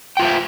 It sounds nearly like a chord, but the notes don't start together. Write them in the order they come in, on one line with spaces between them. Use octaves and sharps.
G5 F4 C5 E5